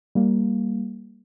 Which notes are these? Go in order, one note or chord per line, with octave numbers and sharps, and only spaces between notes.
G3 A#3